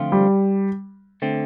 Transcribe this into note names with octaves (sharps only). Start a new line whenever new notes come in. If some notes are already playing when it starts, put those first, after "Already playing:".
Already playing: D3 F3 A3 C4 F4
G3
D3 A3 C4